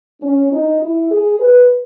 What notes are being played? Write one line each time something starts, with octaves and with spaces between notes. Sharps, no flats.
C#4
D#4
E4
G#4
B4